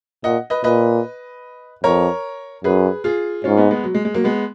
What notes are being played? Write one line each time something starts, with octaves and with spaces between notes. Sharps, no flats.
A#2 D#5 F#5
B4 D#5
A#2 B4 D#5
F2 A#4 C#5
F#2 G#4 B4
F4 G#4
G#2 C#4 F4
B3 D#4
G#3 B3
F#3
G#3
G#3
F#3 A#3
G#3 B3